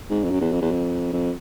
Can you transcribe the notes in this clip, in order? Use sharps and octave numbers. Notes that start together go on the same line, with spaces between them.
G#2
F2
F#2
E2
F2
E2
F2
F2